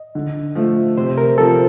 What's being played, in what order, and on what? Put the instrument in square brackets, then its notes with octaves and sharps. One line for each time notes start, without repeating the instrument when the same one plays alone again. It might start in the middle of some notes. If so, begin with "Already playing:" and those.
Already playing: [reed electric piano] D#5
[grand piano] D3
F3 A3
[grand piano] C3 [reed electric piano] C5
[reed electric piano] A#4
[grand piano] F3 C4 [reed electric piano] A4